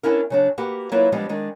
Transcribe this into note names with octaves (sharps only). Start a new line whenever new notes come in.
B3 C#4 D4 E4 A#4
C#3 F#3 D4
A#3 F#4 G4 B4
F#3 A#3 E4 F4 B4 E5
F3 G3 G#3 B3 D4
D#3 G#3 D4